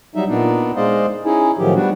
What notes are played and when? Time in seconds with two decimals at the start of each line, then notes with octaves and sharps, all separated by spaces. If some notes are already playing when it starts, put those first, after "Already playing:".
0.16 F#3 G3 D#4 E5
0.29 A#2 B3 D4 D#4
0.76 G#3 C5 D5 D#5 F5
1.25 C#4 D#4 E4 G#4
1.59 A2 D#3 F3 F#3 G4
1.74 G3 B3 D4 F#4